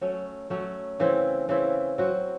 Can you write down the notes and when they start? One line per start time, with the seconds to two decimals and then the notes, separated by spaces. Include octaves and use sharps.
0.01 F#3 A3 C#4
0.50 F#3 A3 C#4
1.00 C#3 E3 C4 E4
1.49 C#3 E3 C4 E4
1.98 F#3 C4 F#4